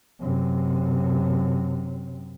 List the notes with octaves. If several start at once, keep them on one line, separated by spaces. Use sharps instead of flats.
F#2 C3